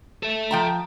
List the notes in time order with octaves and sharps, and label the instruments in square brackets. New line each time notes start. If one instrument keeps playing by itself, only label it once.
[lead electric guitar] A4 E5
[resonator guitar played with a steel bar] F3 G5 A#5